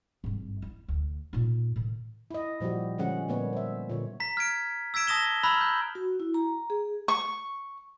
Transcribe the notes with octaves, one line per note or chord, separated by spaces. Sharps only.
G#1 G2
E4
D2
A#2 D#4
A2 D#3
E4 D#5
A#2 F3 G3 F#4 G4
D3 F3 G#3 C#4 F#5
A#2 G3 A#3 B3 C#5
C5 E5
A#2 D3 C#5
A#5 B6
F6 G#6 D7
E6 G#6 B6 D7 E7
A5 D#6 A#6 E7 G7
A#5 B5 E6 F#6 G#6 F#7
F6 G6
F#4
E4
A#5
G#4
C#6